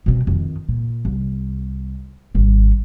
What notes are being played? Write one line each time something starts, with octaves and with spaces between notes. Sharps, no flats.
B2 C4
F2 D#3
A#2
C2
G#1 G3